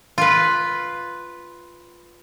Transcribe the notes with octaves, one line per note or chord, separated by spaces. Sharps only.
F4 B4